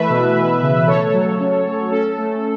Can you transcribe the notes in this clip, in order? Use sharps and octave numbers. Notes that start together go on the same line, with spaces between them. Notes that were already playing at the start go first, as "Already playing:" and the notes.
Already playing: E3 A3 B4 E5
B2
E3
C#3
A3 A4 C#5
F#3
C#4
A3
C#4 A4
A3